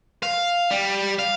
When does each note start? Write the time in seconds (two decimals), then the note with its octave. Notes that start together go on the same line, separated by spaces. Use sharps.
0.23 F5
0.71 G3
1.19 F5